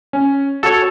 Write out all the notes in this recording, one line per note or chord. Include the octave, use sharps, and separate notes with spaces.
C#4
F#4 A4 C#5